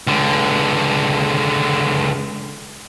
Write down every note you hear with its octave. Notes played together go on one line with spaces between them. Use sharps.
C#2 D3